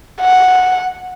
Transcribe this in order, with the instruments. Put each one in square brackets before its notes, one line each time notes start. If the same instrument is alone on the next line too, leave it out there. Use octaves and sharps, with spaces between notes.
[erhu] F#5